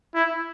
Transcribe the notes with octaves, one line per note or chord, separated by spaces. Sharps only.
E4